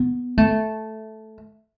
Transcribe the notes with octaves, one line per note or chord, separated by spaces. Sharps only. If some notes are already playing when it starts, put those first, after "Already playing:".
Already playing: B3
A3